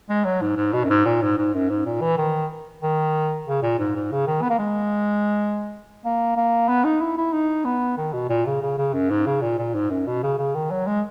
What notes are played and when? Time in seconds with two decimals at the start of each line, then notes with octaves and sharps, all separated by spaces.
0.10 G#3
0.25 F#3
0.42 G#2
0.57 G#2
0.73 B2
0.84 F#2
0.90 G#2
1.05 A#2
1.22 G#2
1.38 G#2
1.54 F#2
1.70 G#2
1.86 A#2
2.02 E3
2.18 D#3
2.82 D#3
3.47 C#3
3.63 A#2
3.79 G#2
3.96 G#2
4.12 C#3
4.27 D#3
4.42 B3
4.50 A#3
4.59 G#3
6.05 A#3
6.37 A#3
6.68 B3
6.84 D#4
7.01 E4
7.17 E4
7.33 D#4
7.65 B3
7.98 D#3
8.13 B2
8.30 A#2
8.46 C#3
8.62 C#3
8.78 C#3
8.94 F#2
9.10 G#2
9.26 C#3
9.42 A#2
9.58 A#2
9.75 G#2
9.91 F#2
10.07 B2
10.23 C#3
10.39 C#3
10.55 D#3
10.71 F#3
10.87 G#3